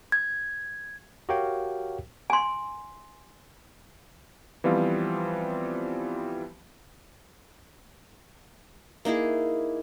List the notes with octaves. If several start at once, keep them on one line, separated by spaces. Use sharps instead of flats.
G#6
F#4 G4 A#4 C#5 F5 G5
G#5 C6
E3 F3 G3 B3 C4 F4
A#3 D#4 E4 G#4